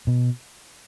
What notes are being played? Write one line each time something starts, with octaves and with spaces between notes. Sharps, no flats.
B2